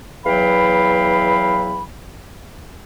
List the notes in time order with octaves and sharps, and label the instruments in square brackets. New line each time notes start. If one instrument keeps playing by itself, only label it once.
[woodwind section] E2 E3 F#3 F5 G5 B5